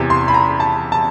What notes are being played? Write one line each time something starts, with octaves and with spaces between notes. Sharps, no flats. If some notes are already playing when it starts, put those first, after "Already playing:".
Already playing: E2 C3 E3
C6
B5
A#5
A5
A5